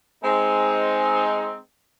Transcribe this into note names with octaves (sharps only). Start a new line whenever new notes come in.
G#3 C4 D#4